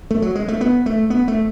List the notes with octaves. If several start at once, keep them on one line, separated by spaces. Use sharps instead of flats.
A3
F#3
G#3
A3
B3
A3
B3
A3